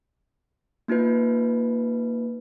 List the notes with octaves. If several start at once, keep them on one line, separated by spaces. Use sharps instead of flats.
A#3 D#4 F4 B4